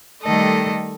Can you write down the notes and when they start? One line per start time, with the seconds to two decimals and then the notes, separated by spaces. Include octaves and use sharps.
0.23 D#3 G3 A3 A4 D#5